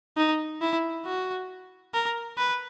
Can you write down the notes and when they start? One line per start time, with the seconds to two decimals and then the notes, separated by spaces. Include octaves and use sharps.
0.17 D#4
0.61 E4
1.06 F#4
1.94 A#4
2.38 B4